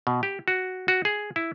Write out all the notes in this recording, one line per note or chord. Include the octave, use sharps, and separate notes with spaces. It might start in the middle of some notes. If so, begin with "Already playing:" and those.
B2
G4
F#4
F#4
G#4
E4